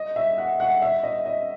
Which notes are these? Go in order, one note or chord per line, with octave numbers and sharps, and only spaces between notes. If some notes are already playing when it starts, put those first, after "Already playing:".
Already playing: D#5
E5
F#5
F#5
E5
D#5
D#5